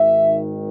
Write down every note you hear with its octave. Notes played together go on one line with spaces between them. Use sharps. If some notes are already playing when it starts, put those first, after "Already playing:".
Already playing: G#1 G#2 D#3 E5